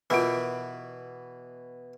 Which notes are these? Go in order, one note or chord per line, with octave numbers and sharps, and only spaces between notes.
B2 E3 F4 A#4 B4